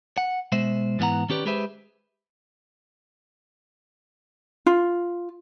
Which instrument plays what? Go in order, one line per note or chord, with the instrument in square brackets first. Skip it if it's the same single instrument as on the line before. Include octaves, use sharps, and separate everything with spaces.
[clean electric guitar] F#5
B2 G#3 C5 E5
G#2 E3 B3 E4 F#5 A#5
D#3 C#4 G4 B4 D5
G#3 G4 G#4 B4 C5 E5
[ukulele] F4